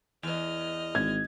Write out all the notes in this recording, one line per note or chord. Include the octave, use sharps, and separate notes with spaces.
E2 D#5 F6
G#1 G#6